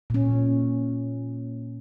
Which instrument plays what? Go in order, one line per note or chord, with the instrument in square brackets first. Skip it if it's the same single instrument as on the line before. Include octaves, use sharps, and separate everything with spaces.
[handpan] A#2 C#4